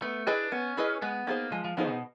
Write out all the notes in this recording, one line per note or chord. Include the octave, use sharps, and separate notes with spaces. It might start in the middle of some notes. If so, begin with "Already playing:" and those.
A3 B3
D4 E4 G#4 B4 D#5
B3 C#4
E4 G#4 B4 D#5
G#3 B3
A#3 B3 D#4 G#4 C5
F3 G#3
F3
F3 B3 D#4 G#4 C5
B2